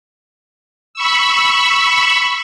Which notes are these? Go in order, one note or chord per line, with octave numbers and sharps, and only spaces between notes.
B5 C#6 E6